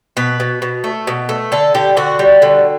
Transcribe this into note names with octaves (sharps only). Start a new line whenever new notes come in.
B2 B4
B2
B2
A3
B2
A3
D3 A4
D3 G4
D3 F#4
G3
D3